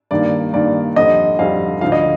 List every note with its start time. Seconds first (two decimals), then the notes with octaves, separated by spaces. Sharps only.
0.11 G2 D#3 A#3 D5
0.53 G2 D#3 A#3 D5
0.96 F2 D3 G3 D#5
1.39 F2 D3 G3 F5
1.81 D2 D3 F3 F5
1.92 D#5